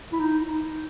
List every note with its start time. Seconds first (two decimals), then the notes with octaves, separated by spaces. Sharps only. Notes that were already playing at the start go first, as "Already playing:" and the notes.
0.12 E4
0.19 D#4